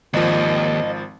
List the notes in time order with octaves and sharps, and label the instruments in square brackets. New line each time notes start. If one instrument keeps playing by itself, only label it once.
[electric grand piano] G#1 F3 [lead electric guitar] D#2 [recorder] D#5